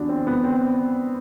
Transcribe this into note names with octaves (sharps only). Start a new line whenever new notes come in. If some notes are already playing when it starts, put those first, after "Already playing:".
Already playing: E2 D4 F#4
C4
B3
C4